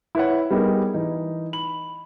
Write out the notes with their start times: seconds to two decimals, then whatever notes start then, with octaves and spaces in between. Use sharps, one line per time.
0.15 E4 B4 C#5 F#5
0.50 G3 B3 D#4 G#4 A#4
0.94 E3 D#4
1.53 B5 F#7